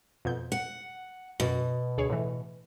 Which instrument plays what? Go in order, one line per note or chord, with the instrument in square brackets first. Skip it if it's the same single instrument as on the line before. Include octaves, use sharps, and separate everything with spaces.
[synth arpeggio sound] F2 B2 G6
[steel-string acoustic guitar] F#5
[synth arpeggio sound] F#2 [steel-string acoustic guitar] B2
[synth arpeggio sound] D2 G#4 C#5
A2 E3